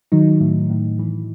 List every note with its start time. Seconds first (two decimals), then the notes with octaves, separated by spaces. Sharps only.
0.12 D#3 F#3 D#4
0.40 A2
0.70 A2
0.99 E3